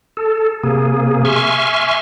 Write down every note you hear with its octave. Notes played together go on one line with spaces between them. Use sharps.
A4
C3 A#3 G#4
E5 G#5 C6 C#6 F6